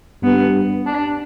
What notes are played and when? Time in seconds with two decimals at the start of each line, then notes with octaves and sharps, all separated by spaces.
0.23 G2 B3
0.86 D4